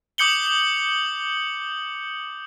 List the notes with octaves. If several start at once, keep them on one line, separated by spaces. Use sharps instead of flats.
D6 D#6 G6 C#7 F#7 G7